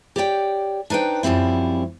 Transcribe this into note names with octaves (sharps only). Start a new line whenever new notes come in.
G4 C#5 D5 E5 G5
D4 D#4 B4 C5 G5
F#2 F3 G3 C4 E4